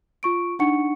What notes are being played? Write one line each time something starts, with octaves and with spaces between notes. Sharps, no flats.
F4 C#6 D7
D4 D#4 F#5 C#6 C#7